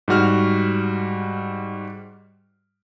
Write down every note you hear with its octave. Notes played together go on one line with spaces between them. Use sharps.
G#2 G3 F#4 F6